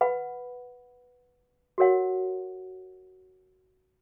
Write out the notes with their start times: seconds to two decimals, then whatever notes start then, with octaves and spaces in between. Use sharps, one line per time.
0.01 B4 F#5 B5
1.78 F#4 A#4 C#5 F#5